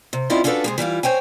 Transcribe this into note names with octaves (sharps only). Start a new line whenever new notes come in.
C3
C4 C#4 E4 F4 D5 D#5
C#4 D4 F4 F#4 A4 B4
C3 G#3 G#4
E3 G3 E4 F4
C5 C#5 G5 G#5